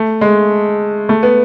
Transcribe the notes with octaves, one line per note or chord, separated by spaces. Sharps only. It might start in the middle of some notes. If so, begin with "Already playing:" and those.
Already playing: A3
G#3
A3
B3